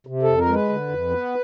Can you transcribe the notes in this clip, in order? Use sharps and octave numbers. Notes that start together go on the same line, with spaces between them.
C3
A4
F2
A#4
G#3 B4
D3
F2
B3